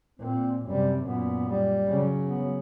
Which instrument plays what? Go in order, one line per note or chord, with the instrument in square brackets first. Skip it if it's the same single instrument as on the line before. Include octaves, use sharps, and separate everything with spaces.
[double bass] A#2 [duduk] C4
[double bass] F#2 C3 [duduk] G3
[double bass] F#2 A#2 [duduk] B3
[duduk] G3
[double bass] C#3 F#3
[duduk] B3